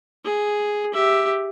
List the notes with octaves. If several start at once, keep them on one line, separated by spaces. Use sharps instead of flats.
G#4
G4 E5